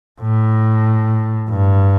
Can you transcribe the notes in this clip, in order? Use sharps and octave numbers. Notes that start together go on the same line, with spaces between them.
A2
G2